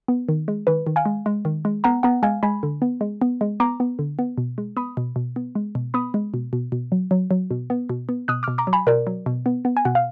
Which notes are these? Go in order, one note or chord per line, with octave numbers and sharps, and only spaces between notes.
B3
D#3
G#3
D#3 B4
D#3
F5 G#5
G#3
G#3
D#3
G#3
B3 F#5 A#5
B3 F#5 A#5
G#3 F5 G#5
G#3 G#5 B5
D3
B3
G#3
B3
G#3
B3 A#5 D6
B3
D3
B3
B2
G#3
B3 B5 D#6
B2
B2
B3
G#3
B2
B3 B5 D#6
G#3
B2
B2
B2
F#3
F#3
F#3
B2
B3
B2
B3
B2 D#6 F#6
B2 D6 F6
A#5 D6
F#3
G#5 B5
B2 A#4 D5
F#3
B2
B3
B3
G#5
B2 F#5
F5